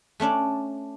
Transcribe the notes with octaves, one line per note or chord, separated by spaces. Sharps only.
A3 C#4 D4 D5